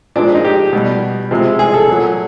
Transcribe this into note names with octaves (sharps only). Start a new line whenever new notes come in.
A#2 F3 G#3 D4
D#4
G4
B2 G3
C3 F3 G#3
G#4
A4
A#2 F#3